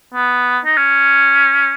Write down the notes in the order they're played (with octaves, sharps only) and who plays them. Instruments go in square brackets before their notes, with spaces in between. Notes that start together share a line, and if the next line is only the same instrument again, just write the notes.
[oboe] B3
D#4
C#4